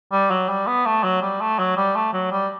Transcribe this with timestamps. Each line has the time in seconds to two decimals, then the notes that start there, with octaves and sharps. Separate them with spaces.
0.12 G3
0.31 F#3
0.49 G3
0.67 B3
0.85 A3
1.04 F#3
1.22 G3
1.41 A3
1.59 F#3
1.77 G3
1.96 A3
2.13 F#3
2.32 G3